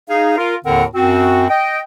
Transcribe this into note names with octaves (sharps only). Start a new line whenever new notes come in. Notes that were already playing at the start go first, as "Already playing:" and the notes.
D#4 G#4 F5
F4 A#4
D#2 A2 D3 C4 A#4 F#5
F#2 C4 F#4
D#5 G5